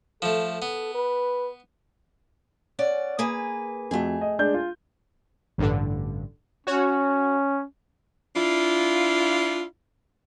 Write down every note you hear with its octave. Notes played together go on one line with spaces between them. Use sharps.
F3 A3 A4
B3
B4
C#4 D5 F#5
A#3 G#4 B4
F2 A3 F#4 G#4
D#5
G#3 D4 G6
F4
A1 G2 D3
C#4 F#4 C#5
D4 E4 F4